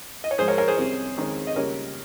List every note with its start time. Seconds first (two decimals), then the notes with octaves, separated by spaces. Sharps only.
0.24 D#5
0.31 C#5
0.38 G#2 F3 G#3 G#4 C5
0.48 A#4 C#5
0.58 A#4 C#5
0.68 G#4 C5
0.77 C2 C3 G3 C#4
1.17 F2 D#3 G#3 C#4
1.47 D#5
1.56 C#2 C#3 G3 A#3 A#4 C#5